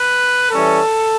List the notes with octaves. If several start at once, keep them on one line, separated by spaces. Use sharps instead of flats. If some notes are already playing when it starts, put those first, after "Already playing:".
Already playing: B4
E3 G3 C#4 A4